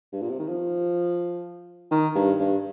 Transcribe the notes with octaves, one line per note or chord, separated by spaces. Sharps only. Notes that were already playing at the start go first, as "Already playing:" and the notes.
G2
A#2
C3
D#3
F3
D#3
G2
G2